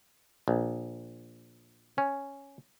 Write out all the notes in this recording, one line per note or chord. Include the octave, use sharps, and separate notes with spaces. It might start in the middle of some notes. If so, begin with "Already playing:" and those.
A#1
C#4